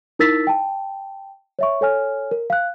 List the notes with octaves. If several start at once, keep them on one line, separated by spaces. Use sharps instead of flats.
D#4 E4 A#4 E6 A6 B6
G5 A5
C#5 E5 C#6
A4 C#5 G#5 F6
A#4
F5 F#6